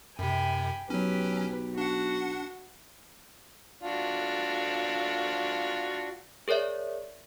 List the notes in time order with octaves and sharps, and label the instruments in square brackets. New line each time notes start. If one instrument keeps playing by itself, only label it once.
[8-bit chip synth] F#2 C3 [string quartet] G5 G#5 B5
[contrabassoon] B1 [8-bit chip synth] F#3 C#4 [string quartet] G4 B4
[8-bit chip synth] D4 F#5 [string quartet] F#4
[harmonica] D4 F4 F#4
[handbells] G#4 A#4 C#5 D5 E5